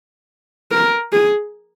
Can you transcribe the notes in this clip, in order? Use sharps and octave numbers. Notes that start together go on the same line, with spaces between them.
A#4
G#4